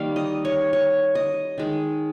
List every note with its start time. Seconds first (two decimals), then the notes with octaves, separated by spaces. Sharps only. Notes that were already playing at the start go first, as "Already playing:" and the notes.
Already playing: D#3 G3 A#3 F5
0.16 D#5
0.45 C#5
0.73 C#5
1.15 D#5
1.58 D#3 G#3